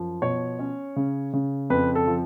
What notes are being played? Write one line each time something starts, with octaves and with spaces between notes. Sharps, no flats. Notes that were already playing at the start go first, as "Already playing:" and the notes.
Already playing: F#2 F3
B2 C#5
C#4
C#3
C#3
F2 B4
A4
F3